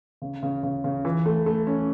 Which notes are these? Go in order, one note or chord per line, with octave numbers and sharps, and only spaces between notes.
C#3
C#3
C#3
C#3
E3
A3
A3
C#4